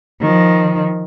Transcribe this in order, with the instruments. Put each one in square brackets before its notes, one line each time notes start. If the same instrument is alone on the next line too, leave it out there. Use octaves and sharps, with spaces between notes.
[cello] D#3 F3